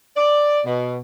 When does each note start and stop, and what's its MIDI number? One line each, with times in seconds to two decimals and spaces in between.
0.16 0.61 74
0.66 0.98 47